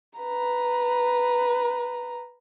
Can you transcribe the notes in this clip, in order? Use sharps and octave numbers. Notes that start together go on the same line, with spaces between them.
B4 A#5